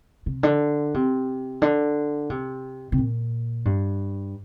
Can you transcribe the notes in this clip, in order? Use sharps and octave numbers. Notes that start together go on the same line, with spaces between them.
C3
D3
C3
D3
C3
C3
A#2
G2